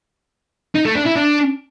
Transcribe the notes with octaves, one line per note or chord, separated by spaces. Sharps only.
D#4
A3
D4
E4
D4